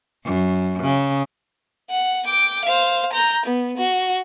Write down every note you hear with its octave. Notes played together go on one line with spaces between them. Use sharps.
F#2
C#3
F#5
G5 D6
C5 F5
A#5 G6
B3
F#4